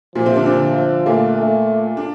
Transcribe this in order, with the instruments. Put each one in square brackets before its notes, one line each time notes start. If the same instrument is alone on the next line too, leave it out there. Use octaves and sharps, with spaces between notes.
[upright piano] A#2 A#3 [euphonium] F3
[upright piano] C3 C4
D3 D4
[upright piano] D3 D4 [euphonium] F3
[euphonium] F3
[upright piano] A#2 A#3 [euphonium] A3
[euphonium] A3
[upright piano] D4